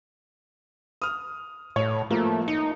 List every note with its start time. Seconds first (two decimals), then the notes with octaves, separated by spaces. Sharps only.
1.02 D#6 F6
1.76 A2 C#5
2.10 F3 A3 A#3
2.48 D#4 C#7